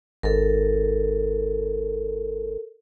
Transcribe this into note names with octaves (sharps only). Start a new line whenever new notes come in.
G#1 A4 A#4